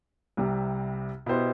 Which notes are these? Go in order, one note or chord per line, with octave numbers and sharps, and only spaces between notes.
C2 C3 G3
B2 B3 E4 G4 C5